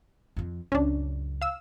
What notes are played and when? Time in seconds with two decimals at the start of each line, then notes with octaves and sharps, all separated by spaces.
0.36 F2 F3
0.72 C#2 F#2 C#4 D4
1.42 F5 E6